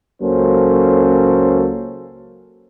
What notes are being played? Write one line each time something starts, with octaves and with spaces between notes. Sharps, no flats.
C#2 F#3 A#3 C#4 A4 C5